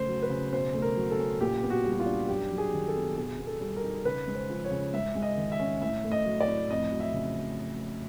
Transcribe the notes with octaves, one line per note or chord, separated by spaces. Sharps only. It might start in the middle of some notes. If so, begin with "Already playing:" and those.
Already playing: C#3 A3 C5
F#3
B4
C#3
B2 C5
A3
A#4
F#3
A4
C#4
A#2 G4
B3
F#4
G3
F#4
F4
D4
F#2 G4
F#3
G#4
D#3
A4
B3
B2 G#4
B3
A4
G3
A#4
D#4
C#3 B4
G#3
C5
F3
C#5
C#3
G#2 E5
G#3
D#5
D#3
E5
C#4
A2 E5
A3
D#5
F#3
D5
A2
F2 D#5
F#3
E5
C#3